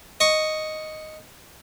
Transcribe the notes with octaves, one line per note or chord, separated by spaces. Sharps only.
D#5 C#6